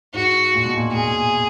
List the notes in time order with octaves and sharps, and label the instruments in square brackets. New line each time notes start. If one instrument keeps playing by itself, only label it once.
[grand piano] G#2 [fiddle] F#4
[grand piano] A#2
B2
A#2
[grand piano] A#2 [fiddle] G#4